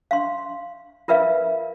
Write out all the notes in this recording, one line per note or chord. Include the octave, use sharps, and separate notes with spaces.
F5 C6
F4 A#4 B4 E5 F5